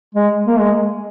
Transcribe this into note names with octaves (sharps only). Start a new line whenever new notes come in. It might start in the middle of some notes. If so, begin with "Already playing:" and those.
G#3
A#3
G#3